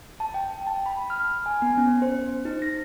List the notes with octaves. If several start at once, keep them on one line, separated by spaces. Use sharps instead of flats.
A5
G5
A5
B5
F6
G#5
B3
C#4
C5
D#4
A#6